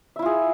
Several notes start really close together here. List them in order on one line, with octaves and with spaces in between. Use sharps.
E5 E4 F4 G#4